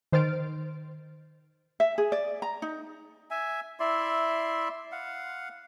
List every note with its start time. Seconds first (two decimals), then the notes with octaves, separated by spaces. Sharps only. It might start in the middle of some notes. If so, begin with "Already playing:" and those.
0.12 D#3 C5 F6 A6 D7
1.80 E5
1.98 G#4
2.12 D5
2.42 A#5
2.62 D#4
3.31 E5 G#5
3.80 E4 D5 E5 C6
4.92 F5 F#5